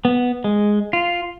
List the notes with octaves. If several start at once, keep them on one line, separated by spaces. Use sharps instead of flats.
B3
G#3
F4